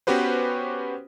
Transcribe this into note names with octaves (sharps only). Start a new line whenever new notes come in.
B3 C#4 F#4 G4 B4 C5